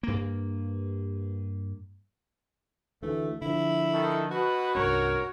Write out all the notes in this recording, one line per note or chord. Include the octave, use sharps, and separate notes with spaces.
G2 A#3
D2 E3 A3
D3 F3 E4
D#3 A4
B2 F#4 B4
C2 G2 C#4 A#4 C#5